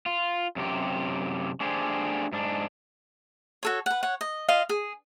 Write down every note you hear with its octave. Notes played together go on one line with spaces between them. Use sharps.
F4
F#2 C3 G4
A3 D4 G4 G#4 C5
G#2 D4
F#4 A4 C#5
B4 F#5
C#5 F#5
D#5
F4 D#5 F5
G#4